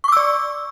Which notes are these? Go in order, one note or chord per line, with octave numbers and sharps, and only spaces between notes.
D5 C#6 D6 E6